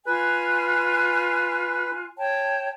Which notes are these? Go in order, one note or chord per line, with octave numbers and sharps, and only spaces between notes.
F4 B4 G#5 F#6
C#5 G5 A5